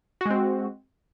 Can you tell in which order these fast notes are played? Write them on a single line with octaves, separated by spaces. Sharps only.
F#4 G#3 C4